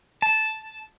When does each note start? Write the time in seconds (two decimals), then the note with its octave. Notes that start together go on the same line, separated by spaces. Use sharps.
0.22 A5